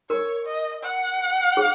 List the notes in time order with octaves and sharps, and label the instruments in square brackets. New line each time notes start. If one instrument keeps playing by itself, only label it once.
[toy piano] A#4 [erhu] C#5
[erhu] D#5
F#5
[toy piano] G#4